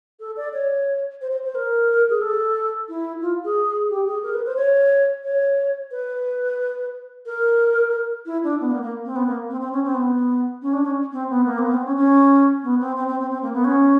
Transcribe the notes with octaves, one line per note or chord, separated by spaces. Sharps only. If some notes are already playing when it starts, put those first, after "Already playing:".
A4
D5
C#5
C5
C5
C5
A#4
G#4
A4
E4
F4
G#4
G4
G#4
A#4
B4
C5
C#5
C#5
B4
A#4
E4
D4
B3
A#3
A#3
C4
B3
A#3
C4
C4
C#4
C4
B3
C#4
D4
C#4
C4
B3
A#3
C4
B3
C4
C#4
C#4
B3
C4
C4
C4
C4
C4
A#3
B3
C#4